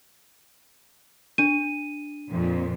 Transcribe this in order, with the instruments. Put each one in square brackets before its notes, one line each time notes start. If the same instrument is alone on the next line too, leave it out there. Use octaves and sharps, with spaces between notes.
[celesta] D4 D#7
[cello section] F2 A#2